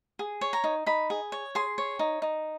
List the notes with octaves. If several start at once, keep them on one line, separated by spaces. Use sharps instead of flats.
G#4
C#5
A#5
D#4
D#4 B5
G#4
C#5
G#4 C6
C#5
D#4
D#4